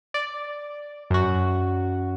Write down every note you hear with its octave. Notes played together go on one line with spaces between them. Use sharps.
D5
F#2 F#4